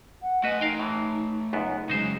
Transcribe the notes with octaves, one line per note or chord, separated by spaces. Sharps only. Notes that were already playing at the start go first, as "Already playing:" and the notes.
F#5
A3 F#4 B4 D#5 G#5
D#4 A#4 F5 G5
A2 E3
C#2 F#2 B3 D#4
C#3 F#3 G#3 D#4 C5